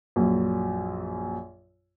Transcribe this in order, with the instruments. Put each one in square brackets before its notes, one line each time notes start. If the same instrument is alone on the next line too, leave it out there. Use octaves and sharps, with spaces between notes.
[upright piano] A#1 F#2